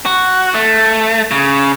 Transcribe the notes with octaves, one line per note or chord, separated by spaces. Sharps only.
F#4
A3
C#3